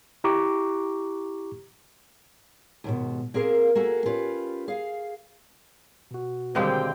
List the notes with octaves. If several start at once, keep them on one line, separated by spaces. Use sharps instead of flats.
E4 G4 A#5 C#6 D6
D#2 G#2 B2
A#3 C4 G#4 A#4 F5
A#3 F#4 G#4 A4
C#4 F4 G4 B4
G#4 F5
B2 F#4
D#2 D3 G3 G#3 A#3 C4 D#5 G5